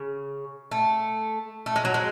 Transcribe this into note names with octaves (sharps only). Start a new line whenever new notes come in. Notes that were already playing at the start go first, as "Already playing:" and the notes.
Already playing: C#3
A3
A3
G#3
F#3
G#3